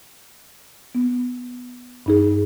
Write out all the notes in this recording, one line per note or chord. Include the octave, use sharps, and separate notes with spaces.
B3
G2 D#4 G#4